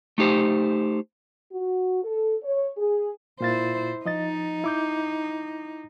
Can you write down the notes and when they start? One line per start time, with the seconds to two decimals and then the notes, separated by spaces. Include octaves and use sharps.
0.18 A3 D#4 G4 C5
1.53 F#4
2.04 A4
2.43 C#5
2.77 G#4
3.41 A#2 E4 F4 C5 A6
4.05 F3 D#4 D#5 A6
4.64 E4 D6 G6